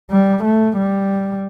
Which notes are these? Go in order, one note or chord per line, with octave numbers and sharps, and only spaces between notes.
G3
A3
G3